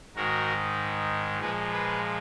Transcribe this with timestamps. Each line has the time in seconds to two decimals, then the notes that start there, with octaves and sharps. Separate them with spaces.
0.15 G#2 D#3 G#3 F#4 A#4
1.40 A#2 F3 G#3 G#4 B4
1.72 G#4 B4